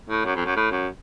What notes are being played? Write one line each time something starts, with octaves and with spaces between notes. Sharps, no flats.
A2
F#2
F2
F#2
A2
F#2